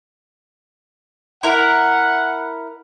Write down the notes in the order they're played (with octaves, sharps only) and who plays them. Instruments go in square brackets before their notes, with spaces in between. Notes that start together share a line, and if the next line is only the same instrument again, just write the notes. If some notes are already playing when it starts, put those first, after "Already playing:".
[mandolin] E4 A#4 [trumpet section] F#5